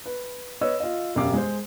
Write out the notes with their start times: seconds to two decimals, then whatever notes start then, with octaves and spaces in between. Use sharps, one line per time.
0.06 B4
0.61 B4 C#5 D#5 E6
0.80 F4 D#5
1.15 E1 F#2 G4 F5 D6
1.33 G#3 C5